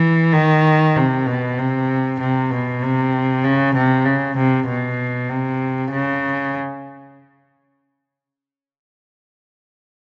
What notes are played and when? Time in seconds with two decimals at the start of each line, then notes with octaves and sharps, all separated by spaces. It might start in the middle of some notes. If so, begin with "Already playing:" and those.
Already playing: E3
0.33 D#3
0.96 C3
1.26 B2
1.58 C3
2.20 C3
2.51 B2
2.82 C3
3.44 C#3
3.75 C3
4.05 C#3
4.37 C3
4.68 B2
5.29 C3
5.92 C#3